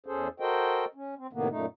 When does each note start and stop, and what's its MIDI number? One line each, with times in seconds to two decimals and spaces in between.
0.06 0.28 40
0.06 0.28 61
0.06 0.28 68
0.06 0.28 69
0.06 0.28 72
0.40 0.85 66
0.40 0.85 69
0.40 0.85 70
0.40 0.85 72
0.40 0.85 75
0.40 0.85 79
0.95 1.15 61
1.18 1.27 60
1.33 1.48 45
1.33 1.48 48
1.33 1.48 51
1.33 1.48 58
1.33 1.48 59
1.50 1.66 42
1.50 1.66 46
1.50 1.66 57
1.50 1.66 63